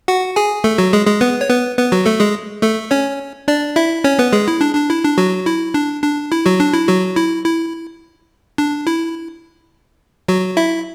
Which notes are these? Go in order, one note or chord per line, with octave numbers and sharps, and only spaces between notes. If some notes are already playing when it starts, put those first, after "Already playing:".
F#4 F#5
G#4 G#5
A3 A4
F#3 F#4
G#3 G#4
G#3 G#4
B3 B4
C#5
B3 B4
B3 B4
F#3 F#4
A3 A4
G#3 G#4
A3 A4
C#4 C#5
D4 D5
E4 E5
C#4 C#5
B3 B4
G#3 G#4
E4
D4
D4
E4
D4
F#3 F#4
E4
D4
D4
E4
F#3 F#4
D4
E4
F#3 F#4
E4
E4
D4
E4
F#3 F#4
E4 E5